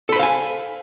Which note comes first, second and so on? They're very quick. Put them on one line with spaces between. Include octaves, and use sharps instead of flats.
A4 B5 C5 F5 G#5